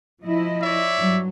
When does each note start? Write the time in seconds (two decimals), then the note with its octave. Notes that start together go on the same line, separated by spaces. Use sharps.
0.23 F3 E4 D#5
0.62 C#5 D5 E5
0.97 G2 F#3